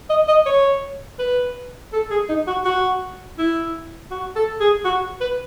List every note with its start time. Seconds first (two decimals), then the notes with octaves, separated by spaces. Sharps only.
0.10 D#5
0.28 D#5
0.46 C#5
1.19 B4
1.93 A4
2.11 G#4
2.29 D#4
2.47 F#4
2.65 F#4
3.39 E4
4.11 F#4
4.36 A4
4.60 G#4
4.85 F#4
5.21 B4